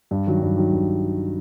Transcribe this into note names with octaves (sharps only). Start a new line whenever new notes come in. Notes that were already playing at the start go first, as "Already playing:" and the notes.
G2
D#3 F#3
G2
D#3 F#3
G2